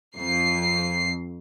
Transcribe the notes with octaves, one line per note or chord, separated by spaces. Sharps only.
F2 C7